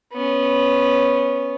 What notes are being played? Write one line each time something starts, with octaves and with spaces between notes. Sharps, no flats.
B3 C#4